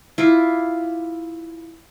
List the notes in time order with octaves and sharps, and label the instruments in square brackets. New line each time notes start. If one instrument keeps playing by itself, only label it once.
[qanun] E4 F4 D6